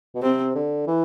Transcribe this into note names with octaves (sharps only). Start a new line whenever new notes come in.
B2
C3 C4
D3
E3